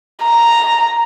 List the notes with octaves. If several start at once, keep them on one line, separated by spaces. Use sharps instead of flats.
A#5